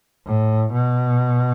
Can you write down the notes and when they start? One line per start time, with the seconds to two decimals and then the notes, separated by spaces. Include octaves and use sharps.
0.26 A2
0.73 B2